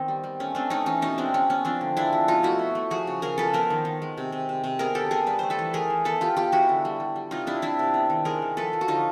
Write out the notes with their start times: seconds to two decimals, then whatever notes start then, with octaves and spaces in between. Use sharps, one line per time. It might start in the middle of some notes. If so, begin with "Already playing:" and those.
Already playing: D#3 B3 C4
0.08 G3
0.24 G3
0.40 A3 C#4
0.55 A3 C4 D4
0.70 A3 C#4 D#4
0.86 E3 C#4 D#4
1.02 B2 C#4 D#4
1.18 G#3 C4 D4
1.34 G#3 C#4
1.50 B3 C#4
1.65 F3 C4 D4
1.81 D3
1.97 G#3 D4 E4
2.13 F3
2.28 B2 D#4 F4
2.43 A3 E4 F#4
2.59 B2
2.75 A3
2.90 F3 F#4 G#4
3.07 C#3
3.22 C#3 G#4 A#4
3.38 F3 A4 B4
3.53 B3 A#4 C5
3.70 D#3
3.85 D#3
4.02 G#3
4.18 C3
4.32 C3
4.49 C3
4.64 C3
4.79 B3 G#4 A#4
4.95 D3 G4 A4
5.11 B3 G#4 A#4
5.27 G3 B4
5.39 A3 C5
5.50 A4 B4
5.59 E3
5.73 A3 G#4 A#4
5.90 E3
6.05 B3 A4 B4
6.21 G#3 F4 G4
6.37 B3 F4 G4
6.52 G#3 E4 F#4
6.69 D3
6.85 G3
7.00 G3
7.16 G3
7.31 C3 D#4 F4
7.47 C3 D4 E4
7.62 C3 D4 E4
7.79 C3
7.94 B3
8.10 D#3
8.25 G#3 G#4 A#4
8.42 D#3
8.57 F3 A4 B4
8.73 F3
8.81 F#4
8.88 D3 D#4 F4